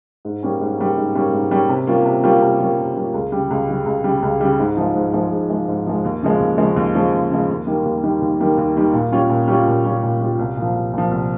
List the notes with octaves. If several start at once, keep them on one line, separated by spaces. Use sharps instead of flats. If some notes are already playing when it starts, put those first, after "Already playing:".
G#2
G3 A#3 C#4
G#2
G3 A#3 C#4
G#2
G3 A#3 C#4
G#2
G3 A#3 C#4
C3
G3 A#3 C#4 F4
C3
G3 A#3 C#4 F4
C3
G3 A#3 C#4 F4
C3
G3 A#3 C#4 F4
C#2
C#3 G3
C#2
C#3 G3
C#2
C#3 G3
C#2
C#3 G3
G#2
F3 G#3
G#2
F3 G#3
G#2
F3 G#3
G#2
F3 G#3
D#2
C#3 F3 G#3
D#2
C#3 F3 G#3
D#2
C#3 F3 G#3
D#2
C#3 F3 G#3
D#2
D#3 G3 A#3
D#2
D#3 G3 A#3
D#2
D#3 G3 A#3
D#2
D#3 G3 A#3
A#2
G3 C#4 F4
A#2
G3 C#4 F4
A#2
G3 C#4 F4
A#2
G3 C#4 F4
C2
A#2 F3
C2
A#2 F3
C2